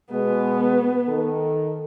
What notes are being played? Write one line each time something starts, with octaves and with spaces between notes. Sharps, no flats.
B2 G#3 B3
D#3 A4